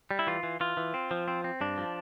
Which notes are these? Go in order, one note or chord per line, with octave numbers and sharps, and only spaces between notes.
G3
E4
E3 F4
E3
E3 F4
E3
C4
F3
C4
C4
G2 D4
F3